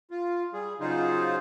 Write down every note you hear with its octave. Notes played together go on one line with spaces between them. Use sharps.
F4
G3 G#4
C#3 F#3 D#4 F4 G#4 C5